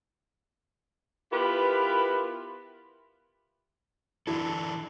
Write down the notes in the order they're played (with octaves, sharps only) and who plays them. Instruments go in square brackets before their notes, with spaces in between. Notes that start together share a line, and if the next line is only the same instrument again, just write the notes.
[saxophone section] B3 E4 F4 G4 A#4 B4
[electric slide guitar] E3 D4 A4 [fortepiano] E4